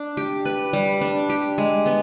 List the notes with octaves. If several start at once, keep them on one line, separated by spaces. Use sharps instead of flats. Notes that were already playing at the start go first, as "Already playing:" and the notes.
Already playing: D4
G4
B4
G3
D4
G4
G#3
B3